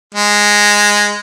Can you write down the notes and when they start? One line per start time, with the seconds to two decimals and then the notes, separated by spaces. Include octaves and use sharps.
0.14 G#3